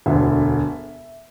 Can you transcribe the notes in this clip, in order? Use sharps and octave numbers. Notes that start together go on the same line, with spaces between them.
E1 D2 D3 E5